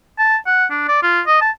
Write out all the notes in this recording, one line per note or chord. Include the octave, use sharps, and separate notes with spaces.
A5
F#5
D4
D5
F4
D#5
A5